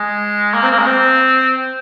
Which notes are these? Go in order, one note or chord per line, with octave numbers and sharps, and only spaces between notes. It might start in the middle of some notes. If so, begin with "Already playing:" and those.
Already playing: G#3
A#3
C4
A#3
G#3
C4